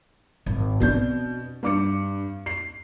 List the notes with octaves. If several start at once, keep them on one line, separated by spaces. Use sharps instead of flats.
G#1
B2 C4 D4 G6
G2 D6 C#7
C7